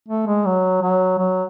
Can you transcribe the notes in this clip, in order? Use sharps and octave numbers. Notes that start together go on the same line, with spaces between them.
A3
G#3
F#3
F#3
F#3